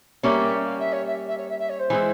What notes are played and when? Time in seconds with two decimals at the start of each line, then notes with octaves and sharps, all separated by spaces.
0.23 G3 A#3 C#4 E5
0.65 F5
0.79 E5
0.92 C#5
1.07 E5
1.28 E5
1.38 C#5
1.49 E5
1.59 E5
1.69 C#5
1.79 C5
1.90 E3 G#3 E4